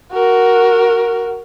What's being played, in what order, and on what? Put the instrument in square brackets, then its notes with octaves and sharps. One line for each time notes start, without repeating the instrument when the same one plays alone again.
[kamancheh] F#4 A#4